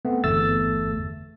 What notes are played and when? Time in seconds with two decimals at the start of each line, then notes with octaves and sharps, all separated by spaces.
0.05 A3 B3 C4
0.24 G1 E2 A3 E6 A6